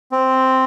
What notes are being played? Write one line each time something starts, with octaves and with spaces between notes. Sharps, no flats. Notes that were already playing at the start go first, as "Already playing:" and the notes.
C4